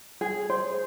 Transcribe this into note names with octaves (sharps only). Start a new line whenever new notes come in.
G#4
C5